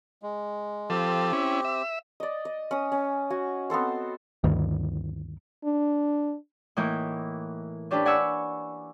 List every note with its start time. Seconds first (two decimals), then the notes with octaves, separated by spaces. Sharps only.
0.22 G#3
0.90 F3 C4 G4 A4
1.33 C#4 E4
1.65 E5
2.20 D5 D#5
2.45 D#5
2.71 C#4 D#6
2.92 C#4
3.30 F#4 G#5
3.70 B3 C4 A4 C5
4.44 D2 G2 D#3
5.64 D4
6.77 A2 E3 A#3 D#4 E4 G6
7.91 C#4 D4 G4 A4 B4
8.05 D5 F#5 G#5 B5 C#6 E6